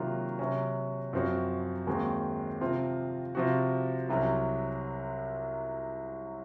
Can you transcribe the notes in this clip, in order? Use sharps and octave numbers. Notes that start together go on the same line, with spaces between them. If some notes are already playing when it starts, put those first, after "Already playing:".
Already playing: C3 D#3 F#3 A#3 F4
C3 F#3 C#4
F#2 F3 C4 F#4
D#2 D#3 G#3 C4 F#4
C3 F3 C4 F4
C3 F3 C4 F#4
C2 C3 F#3 C#4